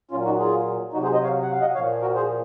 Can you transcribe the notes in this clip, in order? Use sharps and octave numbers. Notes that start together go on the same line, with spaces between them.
A#2 F#3 C#4 F4
D#4 F#4
F4 G#4
C3 F#3 D#4 F#4
G#4 C5
C5 D#5
C#5 F5
F#5
F5
D#5 F#5
A#2 F3 C#5 F5
F#4 A#4
G#4 C5